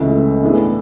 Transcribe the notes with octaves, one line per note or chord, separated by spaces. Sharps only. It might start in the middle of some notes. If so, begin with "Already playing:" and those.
Already playing: C#2 C#3 E3 A3
A2 E3 B3 D4 G#4